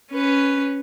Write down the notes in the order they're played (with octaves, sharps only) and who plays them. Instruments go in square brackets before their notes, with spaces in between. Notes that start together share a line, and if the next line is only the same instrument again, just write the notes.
[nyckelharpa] C#4 B4